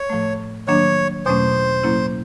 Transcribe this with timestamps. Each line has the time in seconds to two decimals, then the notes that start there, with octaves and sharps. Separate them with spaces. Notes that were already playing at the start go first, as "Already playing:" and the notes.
Already playing: C#5
0.10 A2 F3 A3
0.67 D#3 F#3 A#3 D4 C#5
1.26 E2 B2 F#3 A3 C#4 C5
1.83 A2 F#3 A#3 C#4 E4